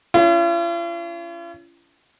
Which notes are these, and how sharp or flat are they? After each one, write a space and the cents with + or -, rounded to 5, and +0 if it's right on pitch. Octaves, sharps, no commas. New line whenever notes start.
C#4 +30 F4 -45